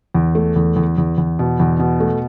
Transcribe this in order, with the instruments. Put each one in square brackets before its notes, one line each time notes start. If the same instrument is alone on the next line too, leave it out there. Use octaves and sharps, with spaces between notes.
[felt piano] E2
A3
E2
E2
E2
E2
B2
E2
B2
A3